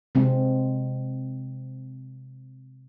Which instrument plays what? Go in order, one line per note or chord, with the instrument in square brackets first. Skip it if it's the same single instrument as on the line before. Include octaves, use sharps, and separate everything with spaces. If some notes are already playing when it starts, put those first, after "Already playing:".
[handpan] C3 G#3 C4